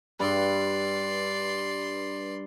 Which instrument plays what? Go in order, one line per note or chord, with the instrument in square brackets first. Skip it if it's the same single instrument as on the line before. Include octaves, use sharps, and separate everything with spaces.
[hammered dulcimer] G2 B4 [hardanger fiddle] D5 C6